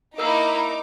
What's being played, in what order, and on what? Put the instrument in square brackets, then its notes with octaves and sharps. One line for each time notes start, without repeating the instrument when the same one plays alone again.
[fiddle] A#3 E4 [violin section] D#4 D6 [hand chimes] A#4 E6